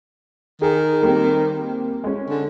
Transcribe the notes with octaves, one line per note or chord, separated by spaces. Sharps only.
D#3 G#4
G3 A#3 C4
G#3 C#4
D3